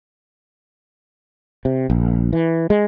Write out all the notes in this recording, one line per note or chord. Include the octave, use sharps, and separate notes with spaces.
C3
A#1
E3
G#3